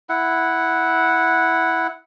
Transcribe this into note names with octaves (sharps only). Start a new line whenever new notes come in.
E4 F#5